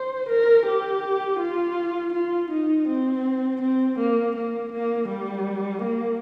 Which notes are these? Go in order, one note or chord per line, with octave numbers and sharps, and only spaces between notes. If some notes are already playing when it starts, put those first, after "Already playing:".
Already playing: C5
A#4
G4
F4
F4
D#4
C4
C4
A#3
A#3
A#3
G3
A#3